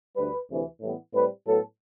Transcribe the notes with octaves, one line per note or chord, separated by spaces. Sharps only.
D2 D3 G3 B4
D2 C3 E3
A2 E3 G3 B3
A2 G3 C4 B4
A2 F#3 B3 A4